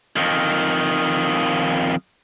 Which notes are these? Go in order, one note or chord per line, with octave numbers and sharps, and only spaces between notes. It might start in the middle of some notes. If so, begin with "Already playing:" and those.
F2 D#3